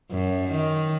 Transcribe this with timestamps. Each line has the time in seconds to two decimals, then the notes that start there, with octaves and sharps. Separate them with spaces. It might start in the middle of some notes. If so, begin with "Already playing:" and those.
0.11 F#2
0.51 D#3